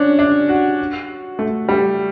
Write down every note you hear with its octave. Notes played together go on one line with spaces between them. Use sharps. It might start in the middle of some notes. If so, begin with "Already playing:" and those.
Already playing: C#4 D4
D4
F#4
A3
G3